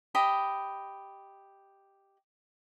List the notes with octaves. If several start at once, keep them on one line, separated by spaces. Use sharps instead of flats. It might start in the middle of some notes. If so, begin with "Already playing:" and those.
G4 D#5 B5